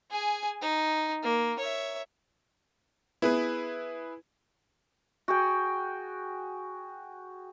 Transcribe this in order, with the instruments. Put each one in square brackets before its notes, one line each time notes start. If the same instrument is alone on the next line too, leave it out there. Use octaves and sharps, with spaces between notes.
[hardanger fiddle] G#4 G#5
D#4
A#3
C#5 E5
[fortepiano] B3 [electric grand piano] E4 G#4 B4
[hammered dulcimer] F#4 G#4 G5